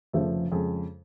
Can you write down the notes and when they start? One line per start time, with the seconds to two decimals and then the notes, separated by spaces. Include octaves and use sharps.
0.13 F1 F2 C#3 F3 A3
0.52 F2 C#3 G#3